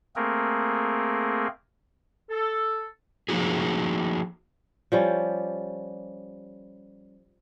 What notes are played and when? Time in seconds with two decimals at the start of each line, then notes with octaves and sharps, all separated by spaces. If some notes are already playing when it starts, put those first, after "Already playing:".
0.16 A3 A#3 C4 G#4 A#4
2.29 A4
3.29 F3 A#3 D#4 F#4 G#4
4.92 F3 G3 C#4